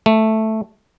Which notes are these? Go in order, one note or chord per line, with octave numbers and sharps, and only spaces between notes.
A3